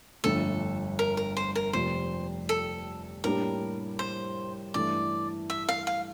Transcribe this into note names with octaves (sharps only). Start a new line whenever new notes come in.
G1 F2 D3 A3 A4
A#4
A#4
C5
A#4
F1 F2 C3 C5
A4
A2 G3 A#3 D4 G4 A#4
C5
G2 E3 A3 D5
E5
F5
F5